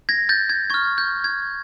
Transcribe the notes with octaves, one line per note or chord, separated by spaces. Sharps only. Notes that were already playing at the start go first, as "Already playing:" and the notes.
G#6 A#6
G6 A6
G#6
C#6 F6 G#6
G6
G#6